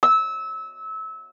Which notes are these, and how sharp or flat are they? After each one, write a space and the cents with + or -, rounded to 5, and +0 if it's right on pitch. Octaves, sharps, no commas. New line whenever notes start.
E6 -25